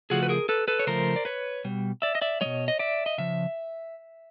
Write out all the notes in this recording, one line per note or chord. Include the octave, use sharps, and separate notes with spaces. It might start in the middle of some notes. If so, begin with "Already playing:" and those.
C#3 F3 A3 F#4 G#4
B4
G#4 A#4
A4 B4
A4 B4
C#5
C#3 F3 A3 A#4 C5
D5
B4 C#5
B2 G3
D5 E5
D#5
D5 E5
B2 G3 C#5 D#5
D#5
D5 E5
D#5
C#3 F3 E5